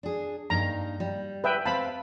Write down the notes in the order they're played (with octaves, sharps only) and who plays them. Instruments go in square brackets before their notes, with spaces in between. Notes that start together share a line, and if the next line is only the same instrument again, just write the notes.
[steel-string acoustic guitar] D4 G#4
[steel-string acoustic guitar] G2 A#3 D#4 [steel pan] A#5
[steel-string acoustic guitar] G3
[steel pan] B4 E5 G5
[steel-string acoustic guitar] C4 F5 [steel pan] A5 B5